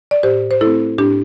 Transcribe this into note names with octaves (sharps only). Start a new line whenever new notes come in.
D5
A2 G4 C5
C5
A3 C4 E4 A4
A2 D4 G4